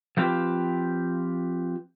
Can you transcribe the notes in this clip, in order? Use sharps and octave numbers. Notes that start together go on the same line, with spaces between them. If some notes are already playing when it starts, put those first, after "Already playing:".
F3 A3 C4 F4 G4 B4